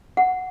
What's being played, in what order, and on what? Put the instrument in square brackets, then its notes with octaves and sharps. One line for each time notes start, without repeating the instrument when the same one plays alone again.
[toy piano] F#5